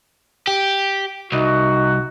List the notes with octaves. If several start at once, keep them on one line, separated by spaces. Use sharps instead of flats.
G4
C2 D#4 F#4